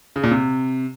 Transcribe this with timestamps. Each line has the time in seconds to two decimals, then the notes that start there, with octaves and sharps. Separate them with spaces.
0.16 C#3
0.24 A#2
0.31 C3